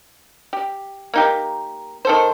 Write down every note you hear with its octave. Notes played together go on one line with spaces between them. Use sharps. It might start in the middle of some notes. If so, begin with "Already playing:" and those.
G4
A#3 D#4 G4
D#3 A4 C5